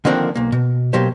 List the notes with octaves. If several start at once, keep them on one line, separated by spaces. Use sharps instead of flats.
D3 D#3 F3 A#3 C4 D4
B1 A#3
B2
B2 F#3 A#3 G4 C5